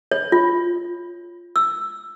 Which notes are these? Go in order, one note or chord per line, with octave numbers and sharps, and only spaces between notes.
C#5
F4
E6